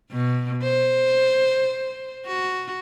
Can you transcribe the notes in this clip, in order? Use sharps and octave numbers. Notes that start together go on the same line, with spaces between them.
B2
C5
F#4